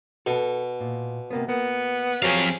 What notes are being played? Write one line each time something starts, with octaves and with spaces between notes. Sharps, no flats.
B2 A4
A#2
C3 A#3 B3
A#3 B3
F2 F#3 G4 G#4 C5 D5 F5